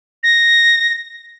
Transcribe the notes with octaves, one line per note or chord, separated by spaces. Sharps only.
A#6